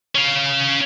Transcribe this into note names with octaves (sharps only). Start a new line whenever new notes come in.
C#4 F5